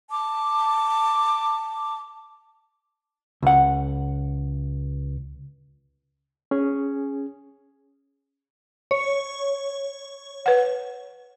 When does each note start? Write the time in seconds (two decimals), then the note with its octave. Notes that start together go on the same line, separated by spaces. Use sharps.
0.10 A5 D6
3.42 C#2 F#5
6.51 C#4 G#4
8.91 C#5
10.46 B4 F#5